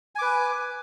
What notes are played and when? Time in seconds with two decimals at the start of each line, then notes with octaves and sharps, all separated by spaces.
0.15 G#5
0.19 D6
0.22 B4